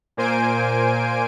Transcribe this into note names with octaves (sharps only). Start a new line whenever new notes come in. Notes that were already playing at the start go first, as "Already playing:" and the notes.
A#2 A#3 C5 G#5 D7